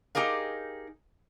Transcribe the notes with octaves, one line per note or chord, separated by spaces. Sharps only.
D#4 G4 G#4 A#4 F5